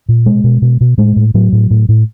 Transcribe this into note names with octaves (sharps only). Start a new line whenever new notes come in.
A#2
B2 G#3
B2
B2
B2
A2 G#3
A2
A2 F#3
A2
A2
A2